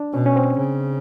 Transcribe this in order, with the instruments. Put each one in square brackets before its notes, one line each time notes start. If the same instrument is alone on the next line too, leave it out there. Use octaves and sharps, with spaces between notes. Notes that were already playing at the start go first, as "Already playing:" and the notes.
Already playing: [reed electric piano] D4
[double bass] B2 [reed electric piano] C#4
[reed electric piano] C#4
C4
[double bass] C#3